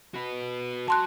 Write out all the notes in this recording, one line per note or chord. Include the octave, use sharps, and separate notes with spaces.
F#4 B4
F#3 A5 C6 F#6